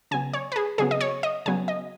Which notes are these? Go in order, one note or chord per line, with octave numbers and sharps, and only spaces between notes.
C#3 F#3 B3 G#5
C#5
B4
G#4
C#3 F#3 B3 G#4
D#5
C#5
D#5
C#3 F#3 B3 G#5
D#5